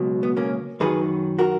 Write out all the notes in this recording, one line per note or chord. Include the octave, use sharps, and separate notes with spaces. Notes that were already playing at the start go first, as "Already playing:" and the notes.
Already playing: C#2 B2 F#3
B3
A#3 C#4
F#2 D#3 F#3 G#4 B4
F#4 A#4